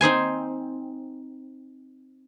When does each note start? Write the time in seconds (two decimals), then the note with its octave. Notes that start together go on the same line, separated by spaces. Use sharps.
0.01 C4 D#4 C5 G#5